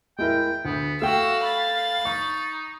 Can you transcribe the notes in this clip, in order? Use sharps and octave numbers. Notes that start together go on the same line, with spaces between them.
G#3 E4 A#4 G5
D2 B3
A3 F#4 F5 G5 E6
B5 A6
D#4 C#6